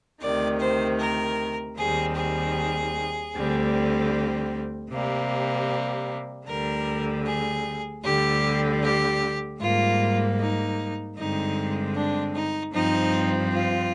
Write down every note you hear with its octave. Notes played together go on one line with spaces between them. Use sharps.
D2 C3 D#3 D5
C5
A#4
D#2 D#3 G3 C4 G#4
G#4
D2 D3 G3 C4
C3 G3 A#3
D2 D3 G3 A#4
G#4
D2 D3 G3 G4
G4
G#2 G3 A#3 F4
D#4
G2 D3 G#3 C4 D#4
D4
D#4
G2 F3 C4 D#4
F4